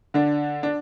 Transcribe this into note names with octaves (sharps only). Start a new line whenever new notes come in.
D3 D4
D4